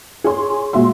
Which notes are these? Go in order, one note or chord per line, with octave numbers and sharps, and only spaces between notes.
G#4 C#5 C6
A#2 G#3 F#4 E5 C6